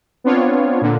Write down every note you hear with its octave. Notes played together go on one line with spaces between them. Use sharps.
B3 C4 D4 F4 C#5
A#2 D3